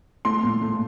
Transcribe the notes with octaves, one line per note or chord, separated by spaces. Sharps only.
A3 C6
A#2
A3